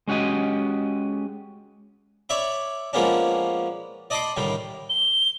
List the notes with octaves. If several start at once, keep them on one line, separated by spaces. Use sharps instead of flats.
G#3 C#4 F#4 G4 D#5
C#5 D5 E5 B5
F3 G#3 A#3 B3 C#4 D4
D5 D#5 A5 B5 C6 D6
A2 D3 D#3 G3
G7